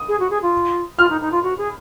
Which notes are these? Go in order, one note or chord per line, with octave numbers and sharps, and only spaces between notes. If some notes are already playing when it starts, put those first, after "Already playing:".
Already playing: D#6
G#4
F#4
G#4
F4
F4 F6
D#4
D#4
F4
F#4
G#4